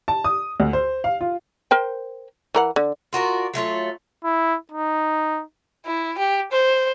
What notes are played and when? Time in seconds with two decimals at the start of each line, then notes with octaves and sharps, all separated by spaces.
0.08 A5
0.24 D#6
0.60 D2
0.73 C5
1.04 F5
1.21 F4
1.71 A#4 C5 G5
2.55 E3 A#4 F#5
2.76 D3
3.13 F4 F#4 A#4 D5
3.54 F#3 A3 F4 C#5
4.24 E4
4.72 D#4
5.86 E4
6.18 G4
6.52 C5